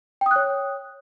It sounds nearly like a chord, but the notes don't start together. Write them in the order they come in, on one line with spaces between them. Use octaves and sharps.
G5 D#6 F#6 C#5